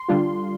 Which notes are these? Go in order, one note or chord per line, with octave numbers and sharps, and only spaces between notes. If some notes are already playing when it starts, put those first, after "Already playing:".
Already playing: C6
D3 G3 D4 F4